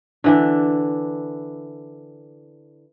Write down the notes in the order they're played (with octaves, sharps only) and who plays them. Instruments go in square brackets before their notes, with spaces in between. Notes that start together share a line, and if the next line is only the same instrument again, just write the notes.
[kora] D3 E3 D4